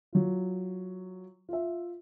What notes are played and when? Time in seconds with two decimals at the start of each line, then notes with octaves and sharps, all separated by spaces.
0.13 F#3 F4
1.49 F4 E5